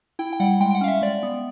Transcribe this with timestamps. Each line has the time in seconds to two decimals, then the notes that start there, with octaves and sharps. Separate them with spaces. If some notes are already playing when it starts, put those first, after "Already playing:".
0.19 E4 G5
0.33 G5
0.40 G3 F#5
0.60 G#3 G5
0.71 G5
0.75 F#5
0.81 C#4 F5
0.88 E5
1.02 G#3 D5
1.23 B3